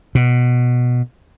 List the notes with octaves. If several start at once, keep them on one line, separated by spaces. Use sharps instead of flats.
B2